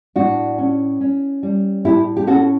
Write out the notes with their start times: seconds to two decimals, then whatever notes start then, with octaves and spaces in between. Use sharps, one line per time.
0.16 A2 D4 F#4
0.58 C#4
1.01 C#4
1.43 G3
1.85 A2 E4 G4
2.17 G4
2.27 C#4 F#4 A4